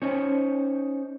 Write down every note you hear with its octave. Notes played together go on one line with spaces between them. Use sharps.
C#4 D#4 C5 C#5